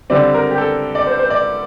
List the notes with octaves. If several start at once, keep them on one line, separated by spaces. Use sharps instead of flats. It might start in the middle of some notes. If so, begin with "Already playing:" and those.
D3 G3 C4 D5
A#4
G4
A4
D5
C5
C5
D5